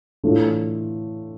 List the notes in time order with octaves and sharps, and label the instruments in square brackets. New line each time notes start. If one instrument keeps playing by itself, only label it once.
[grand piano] A2 E3 A3 D4 F4